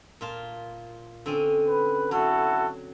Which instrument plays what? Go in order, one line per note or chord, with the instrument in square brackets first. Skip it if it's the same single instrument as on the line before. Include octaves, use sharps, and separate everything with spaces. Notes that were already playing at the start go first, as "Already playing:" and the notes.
[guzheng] A#2 F4 A5
D3 C4 C#4
[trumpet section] B4
[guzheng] F#3 [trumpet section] E4 F#4 A4